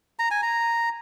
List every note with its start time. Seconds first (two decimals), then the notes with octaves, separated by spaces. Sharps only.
0.19 A#5
0.31 G#5
0.43 A#5